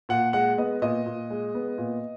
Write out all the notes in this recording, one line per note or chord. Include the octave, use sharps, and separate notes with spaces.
A#2 F#5
G#3 F#5
B3 D#5
A#2 D#5
A#2
G#3
B3
A#2